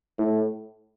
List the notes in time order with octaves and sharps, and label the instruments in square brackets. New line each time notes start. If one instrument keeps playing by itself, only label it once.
[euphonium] A2